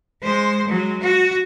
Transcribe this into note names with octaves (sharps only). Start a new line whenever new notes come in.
G#3 C5
F#3 G#3
F#4